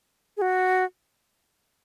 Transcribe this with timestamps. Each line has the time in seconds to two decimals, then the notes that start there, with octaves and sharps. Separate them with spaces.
0.37 G#4
0.42 F#4